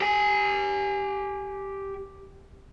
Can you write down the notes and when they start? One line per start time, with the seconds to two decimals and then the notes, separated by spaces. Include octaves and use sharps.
0.01 G4 G#5